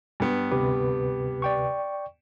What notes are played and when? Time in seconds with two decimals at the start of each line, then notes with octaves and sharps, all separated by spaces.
0.20 G2 B3
0.52 D2 C3 G4 B4
1.42 D5 G5 C#6